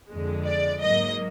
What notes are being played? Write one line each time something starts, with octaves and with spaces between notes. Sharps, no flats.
F2 D3 G#3
D5
G#2 F#3 A#3 D#5